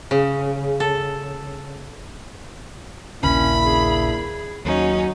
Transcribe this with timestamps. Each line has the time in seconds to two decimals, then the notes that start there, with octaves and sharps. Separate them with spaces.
0.11 C#3
0.80 A4
3.23 A#1 D#2 C#3 A#3 C#4 D4 E4 B5
3.64 G#4
4.65 D#2 F#3 C#4 D#4